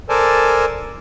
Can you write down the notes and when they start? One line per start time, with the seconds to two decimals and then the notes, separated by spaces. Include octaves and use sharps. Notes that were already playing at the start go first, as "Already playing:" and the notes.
0.09 A4 A#4 C5 D5 G#5 A5